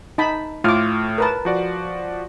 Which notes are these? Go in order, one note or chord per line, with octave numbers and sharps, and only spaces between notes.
D#4 A5 B5
A2 A3 F4 D6 F6
A#4 B4 A5
F3 F#4 D5